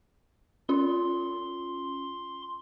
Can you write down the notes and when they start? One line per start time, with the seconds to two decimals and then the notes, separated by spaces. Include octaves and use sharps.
0.69 C#4 F4 C6